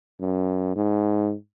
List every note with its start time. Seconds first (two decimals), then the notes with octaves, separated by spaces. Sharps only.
0.21 F#2
0.76 G#2